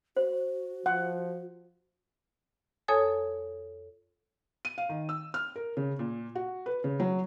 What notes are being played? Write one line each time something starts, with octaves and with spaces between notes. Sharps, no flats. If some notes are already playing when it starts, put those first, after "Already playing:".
F#4 C5
F3 F#5
F2 A4 C#5 G#5 D#6 G#6
D#7
F5
D#3
E6
F6
A#4
C#3
A#2
F#4
B4
C#3
F#3